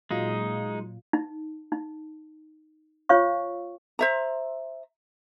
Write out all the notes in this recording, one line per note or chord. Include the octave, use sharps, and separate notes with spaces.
A#2 F#3 G#3 D#4 F4
D#4
D#4
F4 C5 C#5 F5 C#6
C5 E5 A#5